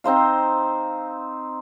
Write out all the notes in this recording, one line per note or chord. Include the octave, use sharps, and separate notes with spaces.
C4 D#4 C5 F5